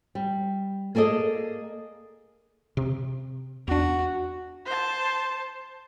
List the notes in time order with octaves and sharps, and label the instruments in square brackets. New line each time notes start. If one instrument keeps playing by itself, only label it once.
[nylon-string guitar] G3
A#3 G#4 A4 D5 D#5
[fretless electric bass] C3
[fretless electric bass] E2 D4 [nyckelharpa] F#4
[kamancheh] C5 A5